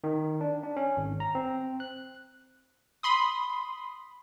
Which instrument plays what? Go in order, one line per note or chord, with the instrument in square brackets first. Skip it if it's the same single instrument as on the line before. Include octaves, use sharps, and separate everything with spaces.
[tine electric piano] D#3
D4
D4
C#4
G#1
A#5
C4
F#6
[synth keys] B5 C6 D#6